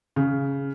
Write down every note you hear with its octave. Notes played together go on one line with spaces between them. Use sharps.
C#3